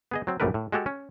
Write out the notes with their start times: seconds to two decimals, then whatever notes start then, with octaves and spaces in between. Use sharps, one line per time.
0.11 B3 G#4 D#5
0.27 F#3 C4
0.40 A#1 F#2 G3 A3 A#4 B4
0.54 A2
0.72 G#3 F#4 G4 A4
0.86 C#4